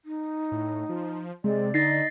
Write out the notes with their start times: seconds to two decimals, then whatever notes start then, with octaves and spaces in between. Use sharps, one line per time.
0.05 D#4
0.52 A2
0.89 F3
1.44 C3 G#3 D5
1.74 D3 D#4 A6 A#6 C7